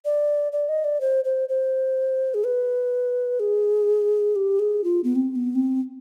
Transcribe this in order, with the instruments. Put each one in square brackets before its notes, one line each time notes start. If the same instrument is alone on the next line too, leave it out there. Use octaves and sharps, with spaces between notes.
[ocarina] D5
D5
D#5
D5
C5
C5
C5
G#4
B4
G#4
G4
G#4
F4
B3
C4
C4
B3
C4